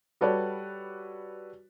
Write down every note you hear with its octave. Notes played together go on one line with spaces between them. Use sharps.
G3 F#4 A4 B4 C#5 D5